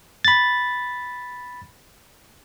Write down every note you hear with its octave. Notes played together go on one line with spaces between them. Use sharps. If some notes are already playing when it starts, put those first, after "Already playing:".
B5 A6